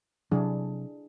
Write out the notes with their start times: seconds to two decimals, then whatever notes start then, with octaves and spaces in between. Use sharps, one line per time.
0.31 C3 F#3 D4 E4 G#4